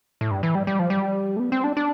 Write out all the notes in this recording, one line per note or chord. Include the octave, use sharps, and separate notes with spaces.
A2
G2
E3
G3
G3
F3
G3
A3
B3
C4
D4
D4